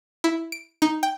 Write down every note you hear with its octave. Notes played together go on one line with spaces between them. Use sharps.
E4
D7
D#4
G5